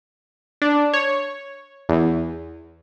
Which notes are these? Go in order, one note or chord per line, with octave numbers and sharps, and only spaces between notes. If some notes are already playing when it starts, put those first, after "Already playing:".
D4
C#5
E2